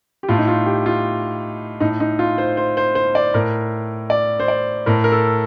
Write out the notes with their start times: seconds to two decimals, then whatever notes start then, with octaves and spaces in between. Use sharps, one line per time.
0.23 G4
0.28 A2 F4
0.38 D#4
0.47 F4
0.66 G4
0.86 F4
1.80 A2 D#4
2.00 D#4
2.19 F4
2.38 C5
2.57 C5
2.77 C5
2.95 C5
3.15 D5
3.34 A2 A#4
4.10 D5
4.40 C5
4.48 D5
4.86 A2 A#4
5.04 A#4
5.12 A4